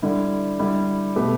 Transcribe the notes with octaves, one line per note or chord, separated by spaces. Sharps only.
D3 G3 E4
D3 G3 E4
B2 A3 G4 B4